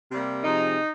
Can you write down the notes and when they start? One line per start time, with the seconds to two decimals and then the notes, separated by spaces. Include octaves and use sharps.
0.10 C3 G3 A#3
0.43 C3 F3 G#3 D#4